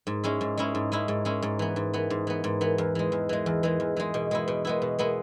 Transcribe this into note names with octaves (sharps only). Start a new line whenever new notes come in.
G#2
G#3 C#4 E4
G#2
G#3 C#4 E4
G#2
G#3 C#4 E4
G#2
G#3 C#4 E4
G#2
E3 B3
G#2
E3 B3
G#2
E3 B3
G#2
E3 B3
E2
E3 G#3
E2
E3 G#3
E2
E3 G#3
E2
E3 G#3
B2
G#3 B3 E4
B2
G#3 B3 E4
B2
G#3 B3 E4